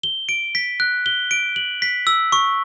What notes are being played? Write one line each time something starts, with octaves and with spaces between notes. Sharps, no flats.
G7
D7
B6
F#6
G7
D7
F#7
B6
E6
C#6